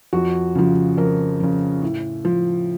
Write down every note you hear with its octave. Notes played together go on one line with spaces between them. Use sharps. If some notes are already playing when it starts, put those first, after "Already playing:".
F2 F#4
C#3 F3
F2 A#4
C#3 F3
A2
F3